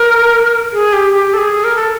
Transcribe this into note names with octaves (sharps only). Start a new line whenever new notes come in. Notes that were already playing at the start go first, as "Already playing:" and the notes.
Already playing: A#4
G#4
G4
G4
A4
G#4
A#4
A4